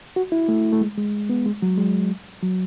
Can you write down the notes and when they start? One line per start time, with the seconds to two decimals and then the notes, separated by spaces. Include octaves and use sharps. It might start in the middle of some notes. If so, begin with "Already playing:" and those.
0.16 F#4
0.32 E4
0.48 A3
0.72 A3
0.81 G#3
0.98 G#3
1.29 B3
1.46 G#3
1.62 F#3
1.78 G#3
2.42 F#3